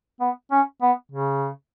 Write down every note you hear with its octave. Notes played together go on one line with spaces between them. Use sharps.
B3
C#4
B3
C#3